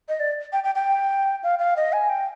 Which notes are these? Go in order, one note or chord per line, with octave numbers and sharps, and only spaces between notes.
D#5
D5
G5
G5
G5
F5
F5
D#5
G#5
G5